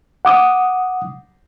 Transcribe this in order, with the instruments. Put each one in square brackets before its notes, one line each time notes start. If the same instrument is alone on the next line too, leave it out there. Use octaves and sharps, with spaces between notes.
[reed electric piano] F#5 D6 D#6